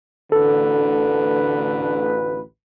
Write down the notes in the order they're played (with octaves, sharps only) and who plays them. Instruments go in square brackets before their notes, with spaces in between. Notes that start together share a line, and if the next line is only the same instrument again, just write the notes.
[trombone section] A1 D2 B4 [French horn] D3 [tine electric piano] A4